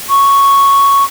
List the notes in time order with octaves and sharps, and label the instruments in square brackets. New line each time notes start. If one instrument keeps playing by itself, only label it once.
[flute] C#6